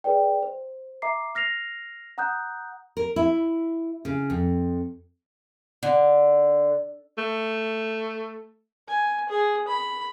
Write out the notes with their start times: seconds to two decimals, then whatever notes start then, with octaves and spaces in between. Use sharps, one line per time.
0.04 G#4 B4 D5 G5
0.43 C5
1.02 E5 A#5 D6 C7
1.35 F6 A#6 C7 F7
2.18 F#5 A#5 D#6 F#6 G6
2.97 A#4
3.16 E4
4.05 C#3
4.30 F2
5.83 D3
7.18 A3
8.88 G#5
9.29 G#4
9.68 B5